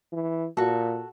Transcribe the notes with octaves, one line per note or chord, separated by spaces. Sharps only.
E3
A#2 F#4 A4